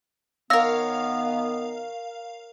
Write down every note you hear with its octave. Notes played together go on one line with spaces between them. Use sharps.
D#3 B3 A#4 C#5 F5 E6 A#6